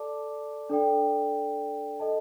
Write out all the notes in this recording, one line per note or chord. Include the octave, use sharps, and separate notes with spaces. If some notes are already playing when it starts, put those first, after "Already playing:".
Already playing: A4 D5 A5 D6
D4 A4 D5 G5
A4 D#5 A5